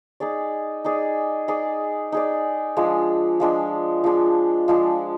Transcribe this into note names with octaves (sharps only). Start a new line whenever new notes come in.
D#4 G#4 D5
D#4 G#4 D5
D#4 G#4 D5
D#4 G#4 D5
F3 G#3 D4
F3 G#3 D4
F3 G#3 D4
F3 G#3 D4